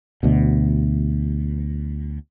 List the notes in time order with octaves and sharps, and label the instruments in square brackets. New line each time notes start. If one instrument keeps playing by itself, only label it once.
[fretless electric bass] D2 B2